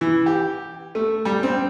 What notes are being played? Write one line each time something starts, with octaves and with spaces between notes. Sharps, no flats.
E3
G4
A3
G3
C4